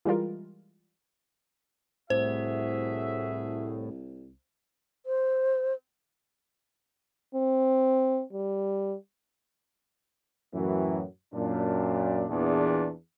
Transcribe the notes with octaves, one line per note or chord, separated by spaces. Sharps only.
E3 G3 G#3 F4 A#4
C2 A2 F#4 G#4 C5 E5
C5
C4
G3
F#2 A2 E3 F#3
F#2 A#2 D4
E2 A#2 D4